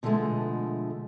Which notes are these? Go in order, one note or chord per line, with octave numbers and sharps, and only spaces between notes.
B2 D3 F3 F#3 G#3 A3